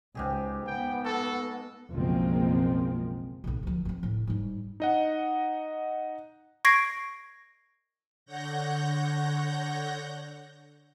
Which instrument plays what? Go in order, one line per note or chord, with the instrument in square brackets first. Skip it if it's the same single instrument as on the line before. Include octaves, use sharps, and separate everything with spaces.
[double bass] C#2 [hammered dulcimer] G#2 G4 G#4
[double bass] B3 [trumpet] G5
[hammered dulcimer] F#4 [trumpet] A4
[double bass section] F#1 B1 F3 G#3 A#3 C4
[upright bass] B1 B2
D2 F3
F3 C4
A2
G#2 G3
[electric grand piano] D#4 D#5 F#5
[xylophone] C#6 G#6 A#6 C7 D7
[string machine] D3 C#5 F#5 G6 A#6